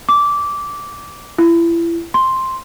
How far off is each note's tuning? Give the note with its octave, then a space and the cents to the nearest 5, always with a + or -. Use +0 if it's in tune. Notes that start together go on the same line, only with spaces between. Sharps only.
D6 -15
E4 +30
C6 +5